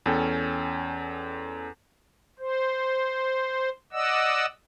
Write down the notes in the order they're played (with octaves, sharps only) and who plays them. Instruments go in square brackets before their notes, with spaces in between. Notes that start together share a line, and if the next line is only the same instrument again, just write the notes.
[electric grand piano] E2 C#4 A4 G5
[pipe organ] C5
D5 D#5 F#5 E6